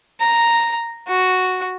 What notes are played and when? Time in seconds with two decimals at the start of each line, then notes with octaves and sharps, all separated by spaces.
0.20 A#5
1.07 F#4